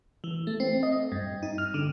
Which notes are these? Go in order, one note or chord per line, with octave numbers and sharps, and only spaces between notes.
E3
A3
C4
D#5
G2
D#4
F6
D3